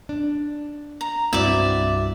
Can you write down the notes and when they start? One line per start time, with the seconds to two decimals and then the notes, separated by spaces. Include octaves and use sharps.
0.09 D4
1.01 A#5
1.33 C2 G2 C4 E4 F#4 D5 E5